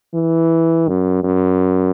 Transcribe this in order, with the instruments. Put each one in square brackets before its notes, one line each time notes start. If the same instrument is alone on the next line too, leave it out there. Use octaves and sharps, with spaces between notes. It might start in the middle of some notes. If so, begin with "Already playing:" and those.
[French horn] E3
F#2
F#2